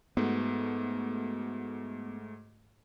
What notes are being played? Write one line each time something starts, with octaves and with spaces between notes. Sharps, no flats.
G#2 A3 B3 F#4